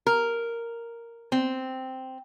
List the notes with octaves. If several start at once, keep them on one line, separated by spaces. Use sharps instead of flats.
A#4
C4